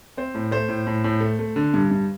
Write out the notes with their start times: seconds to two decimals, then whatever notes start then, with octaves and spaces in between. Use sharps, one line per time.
0.17 C4 C5
0.34 A2
0.51 A3 C5
0.69 A2
0.87 A2
1.04 A2
1.21 A3
1.39 A3
1.56 D3
1.74 G2
1.91 G2